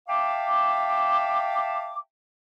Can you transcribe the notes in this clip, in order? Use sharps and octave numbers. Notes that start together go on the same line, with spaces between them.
E5 F5 G5 A5 D6